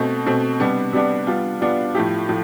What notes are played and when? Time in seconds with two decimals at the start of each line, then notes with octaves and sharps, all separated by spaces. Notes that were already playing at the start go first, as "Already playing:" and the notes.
Already playing: B2 A3 C4
0.26 B2 A3 C4
0.60 C3 G3 B3 D4
0.93 C3 G3 B3 D4
1.27 G3 B3 D4 F4
1.61 G3 B3 D4 F4
1.95 A2 F3 A3 E4 G4
2.29 A2 F3